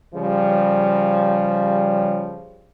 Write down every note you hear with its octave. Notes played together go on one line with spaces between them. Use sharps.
C#3 F3 G3